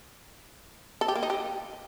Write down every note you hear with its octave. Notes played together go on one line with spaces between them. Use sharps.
A4
G4
A#3
D#4
G4